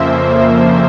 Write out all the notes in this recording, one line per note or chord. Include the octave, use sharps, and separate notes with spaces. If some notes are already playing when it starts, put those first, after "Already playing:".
Already playing: F2 C#3 F3 A#3 C5 E5